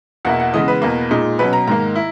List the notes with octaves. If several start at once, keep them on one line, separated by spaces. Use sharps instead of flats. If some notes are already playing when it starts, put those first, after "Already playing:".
E2 B2 A#3 E4 F#5
F#5
C#3 E3 G#3 B3 D#5
B4
E2 B2 A#3
A#2 G#3 D#4
B2 F#3 C#4 B4
A#5
G#2 D#3 A#3 A#5
E4